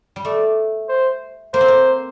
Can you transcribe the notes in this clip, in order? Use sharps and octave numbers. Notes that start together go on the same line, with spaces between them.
G3
A3 D5
C5
A#3 C5
C4
A#3